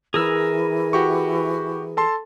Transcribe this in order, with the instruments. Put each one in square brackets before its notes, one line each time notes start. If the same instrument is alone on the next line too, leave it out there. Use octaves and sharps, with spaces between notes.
[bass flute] E3 [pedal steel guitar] G#4 A#4 E6
[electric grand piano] F#4 G4 C#6
A4 A5 C6